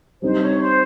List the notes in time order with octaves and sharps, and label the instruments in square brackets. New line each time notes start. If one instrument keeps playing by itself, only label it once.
[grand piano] G3 C4 D#4 [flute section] C5
[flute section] C#5
C5